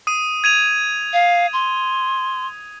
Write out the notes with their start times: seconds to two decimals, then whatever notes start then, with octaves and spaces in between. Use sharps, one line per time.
0.07 D#6 D#7
0.44 G#6 D#7 F7
1.13 F5
1.53 C6